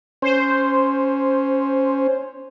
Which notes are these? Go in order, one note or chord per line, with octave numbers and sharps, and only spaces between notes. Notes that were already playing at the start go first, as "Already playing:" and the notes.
C#4 C5